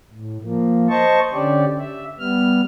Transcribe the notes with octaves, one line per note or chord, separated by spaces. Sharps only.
A2
F3 A#3
C5 D#5 A5 C#6
D3 C#4 G4 D5
E5
G3 B3 F6